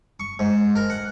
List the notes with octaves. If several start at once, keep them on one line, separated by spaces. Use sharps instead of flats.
C#6
G#2
A#4
F#5